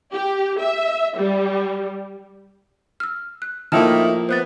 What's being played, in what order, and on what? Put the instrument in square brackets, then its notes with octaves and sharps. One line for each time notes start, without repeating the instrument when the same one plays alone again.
[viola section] G4
E5
G3
[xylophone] E6 F6
F#6
[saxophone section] A2 D#4 E4 [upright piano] F3 A#3 [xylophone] G5 A5 F6
[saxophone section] B3 [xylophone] C5 F#6 A6